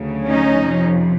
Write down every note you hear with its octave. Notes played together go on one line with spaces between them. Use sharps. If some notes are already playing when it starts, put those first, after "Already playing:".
Already playing: D2 C#3 F#3
C#4 D#4
F2 C3 F3